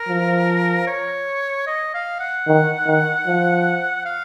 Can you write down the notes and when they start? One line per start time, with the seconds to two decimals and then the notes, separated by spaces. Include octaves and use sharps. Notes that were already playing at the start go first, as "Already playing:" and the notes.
Already playing: A#4
0.09 F3
0.87 C#5
1.67 D#5
1.94 F5
2.20 F#5
2.47 D#3
2.87 D#3
3.27 F3
4.05 F5